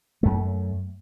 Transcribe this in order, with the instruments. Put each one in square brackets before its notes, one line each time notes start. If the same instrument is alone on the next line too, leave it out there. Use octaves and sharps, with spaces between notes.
[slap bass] F#2 A3